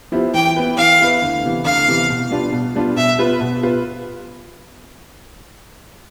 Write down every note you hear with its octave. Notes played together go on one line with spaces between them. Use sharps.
F3 B3 E4 G4
E3 G5
B3 E4 B4
E3 F5
B3 E4 B4
D2
C3 E3 B3
D2 F5
C3 E3 B3
B2
G3 B3 D4 F4
B2
G3 B3 D4 F4
B2 E5
B3 F4 B4
B2
B3 F4 B4